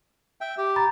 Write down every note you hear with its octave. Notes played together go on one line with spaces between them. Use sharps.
E5 G5
G4
A#5 B5 A6